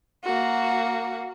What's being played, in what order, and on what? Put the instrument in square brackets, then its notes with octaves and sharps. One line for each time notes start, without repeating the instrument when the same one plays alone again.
[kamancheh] A#3 F#4